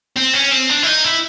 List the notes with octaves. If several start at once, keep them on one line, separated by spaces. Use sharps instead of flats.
C4
C#4
C4
D4
E4
D#4
E4